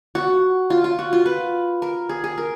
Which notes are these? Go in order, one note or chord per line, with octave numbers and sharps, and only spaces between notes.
F#4
F4
F4
F#4
F4
B4
A#4
G#4
G#4
A#4